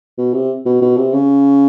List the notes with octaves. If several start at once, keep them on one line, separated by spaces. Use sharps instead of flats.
B2
C3
B2
B2
C3
C#3